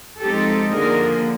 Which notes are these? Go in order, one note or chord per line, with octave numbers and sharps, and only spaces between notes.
F3 G#3 C4 D#4 G4 A4
D3 F3 A#3 G#4 A#4